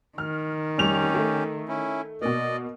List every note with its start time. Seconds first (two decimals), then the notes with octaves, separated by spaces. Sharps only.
0.18 D#3 F6
0.78 F1 G3 C#4 G4 F7
1.15 A3
1.68 C#4 E4
2.22 B2 A#3 D5 D#5